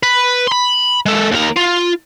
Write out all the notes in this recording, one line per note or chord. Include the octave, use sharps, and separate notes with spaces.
B4
B5 C6
G#3 A4
D#2 A#4
F4